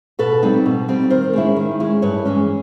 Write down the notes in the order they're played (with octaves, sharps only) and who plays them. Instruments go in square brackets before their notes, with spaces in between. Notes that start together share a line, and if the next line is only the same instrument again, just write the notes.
[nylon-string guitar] B2 A4 B4
G3 C4 D#4
B2
G3 C4 D#4
D#3 A#4 C5
G#3 C#4 E4
D#3
G#3 C#4 E4
G2 B4 C#5
E3 G#3 C#4